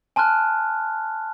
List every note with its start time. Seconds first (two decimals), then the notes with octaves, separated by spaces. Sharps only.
0.16 G#5 A5 C6 F6 F#6